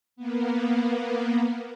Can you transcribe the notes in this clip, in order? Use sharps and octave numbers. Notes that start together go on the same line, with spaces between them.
A#3 B3